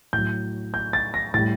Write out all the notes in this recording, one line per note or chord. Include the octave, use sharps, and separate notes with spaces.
A2 F#3 G6
G6
A6
A#6
A2 G3 A6